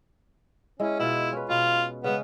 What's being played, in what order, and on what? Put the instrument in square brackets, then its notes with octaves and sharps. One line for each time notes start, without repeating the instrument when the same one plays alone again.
[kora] G#3 E4 [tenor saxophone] C#4
[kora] B2 F4 [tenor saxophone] E4
[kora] C#4 B4
[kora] B2 [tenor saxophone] F4
[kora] C#3 G#3 [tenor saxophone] B3